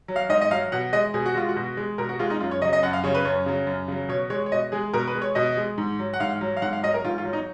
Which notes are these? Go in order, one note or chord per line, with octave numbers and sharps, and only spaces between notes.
F#3
F5
G#2 D#5
D#5
F#3 F5
B2 F#5
G#3 D#5
B2 G#4
F#4
G#3 F4
F#4
B2
G#3
B2 A#4
F#4
G#3 F4
D#4
F#2 F4
C#5
C#3 F#3 D#5
D#5
F#2 F#5
F5
C#3 F#3 C#5
B4
F#2 C#5
C#3 F#3
F#2
C#3 F#3
B2 C#5
G#3 C#5
C#5
B2 D#5
G#3 G#4
B2 A#4
B4
G#3
C#5
B2 D#5
G#3
G#2
F#3
F#5
G#2 F5
F#3
F5
G#2 F#5
F5
F#3 D#5
A#4
G#2 F4
F4
F#3
D#4